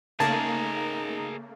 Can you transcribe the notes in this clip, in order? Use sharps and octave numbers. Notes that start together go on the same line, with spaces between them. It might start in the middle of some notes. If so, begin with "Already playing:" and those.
C#3 A3 A#3 D#4 G#4 A#4 A5